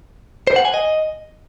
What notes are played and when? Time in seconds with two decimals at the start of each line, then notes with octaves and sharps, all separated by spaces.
0.47 C5
0.56 F#5
0.65 G#5
0.74 D#5